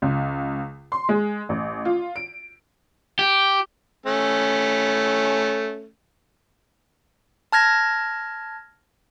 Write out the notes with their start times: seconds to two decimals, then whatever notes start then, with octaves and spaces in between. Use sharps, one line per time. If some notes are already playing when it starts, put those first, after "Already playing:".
0.02 C#2
0.92 C6
1.09 G#3
1.49 A1
1.85 F4
2.16 D7
3.19 G4
4.06 A3 C#4
7.52 A5 F6 G#6 A#6